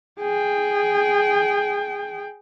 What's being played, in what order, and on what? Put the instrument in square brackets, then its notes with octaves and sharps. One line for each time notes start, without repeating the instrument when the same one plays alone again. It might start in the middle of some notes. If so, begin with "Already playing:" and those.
[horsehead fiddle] G#4 G5